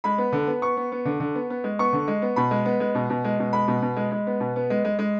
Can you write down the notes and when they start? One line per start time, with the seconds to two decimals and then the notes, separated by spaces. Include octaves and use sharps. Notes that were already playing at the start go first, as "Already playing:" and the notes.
0.04 G#3 B5
0.18 B3
0.32 D3
0.47 B3
0.62 B3 C#6
0.77 B3
0.92 B3
1.05 D3
1.20 D3
1.35 B3
1.50 B3
1.64 G#3
1.79 B3 C#6
1.93 D3
2.08 G#3
2.22 B3
2.36 B2 B5
2.51 G#3
2.65 B3
2.80 G#3
2.95 B2
3.10 B2
3.24 G#3
3.39 B2
3.53 G#3 B5
3.68 B2
3.82 B2
3.97 G#3
4.11 G#3
4.27 B3
4.40 B2
4.56 B3
4.70 G#3
4.85 G#3
4.99 G#3